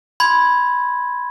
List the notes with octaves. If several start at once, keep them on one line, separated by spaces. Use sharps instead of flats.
B5 C6 G#6